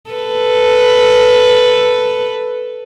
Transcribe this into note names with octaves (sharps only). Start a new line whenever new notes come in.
A4 B4